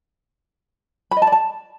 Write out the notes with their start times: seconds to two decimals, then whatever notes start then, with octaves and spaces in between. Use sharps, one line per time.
1.11 B5
1.17 D#5
1.22 A5
1.27 D5
1.32 A5